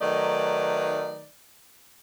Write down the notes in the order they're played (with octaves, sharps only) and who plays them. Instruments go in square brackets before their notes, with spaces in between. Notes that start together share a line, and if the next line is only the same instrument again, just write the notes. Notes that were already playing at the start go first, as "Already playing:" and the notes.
[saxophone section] D#3 F#3 A3 D#4 B4 D5